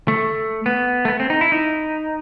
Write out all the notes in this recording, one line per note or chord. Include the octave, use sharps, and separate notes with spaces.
A3
B3
A3
B3
C4
D#4
E4
D#4